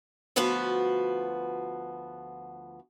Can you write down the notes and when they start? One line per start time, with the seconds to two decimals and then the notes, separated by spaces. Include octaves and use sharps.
0.36 D2 F3 B3 F#4 B4